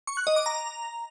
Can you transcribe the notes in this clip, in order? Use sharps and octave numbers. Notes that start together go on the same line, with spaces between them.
C#6
F#6
D#5
D6
A#5